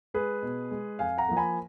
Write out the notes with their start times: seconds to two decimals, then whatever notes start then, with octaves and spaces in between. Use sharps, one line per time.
0.14 G#3 G#4 B4
0.43 B2
0.71 G#3
0.99 F2 F5 G#5
1.18 F#5 A#5
1.28 F3 A#3
1.37 G#5 B5